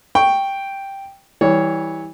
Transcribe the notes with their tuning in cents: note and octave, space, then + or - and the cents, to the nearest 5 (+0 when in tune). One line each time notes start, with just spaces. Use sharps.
G5 +0 C#6 +0
E3 -20 G3 +0 C#5 +0